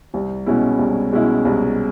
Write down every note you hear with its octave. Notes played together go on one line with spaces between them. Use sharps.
C2
B2 G#3 C#4 E4
C2
B2 G#3 C#4 E4
C2